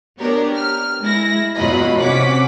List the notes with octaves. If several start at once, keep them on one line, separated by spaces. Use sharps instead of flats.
B3 D4 G4 A#4 C#5
F6
G#3 E4 A#6
E2 B2 F#3 F4 D#5 B5
C3 C#4 C#5 F#5 D6 B6